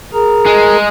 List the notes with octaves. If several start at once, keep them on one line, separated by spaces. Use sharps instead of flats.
G#4 A#4 A#5
G#3